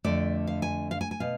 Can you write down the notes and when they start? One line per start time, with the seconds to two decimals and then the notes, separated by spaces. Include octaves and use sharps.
0.04 F2 D3 A3 D5
0.47 F5
0.62 G#5
0.91 F5
1.01 G#5
1.11 G#5
1.20 B2 F5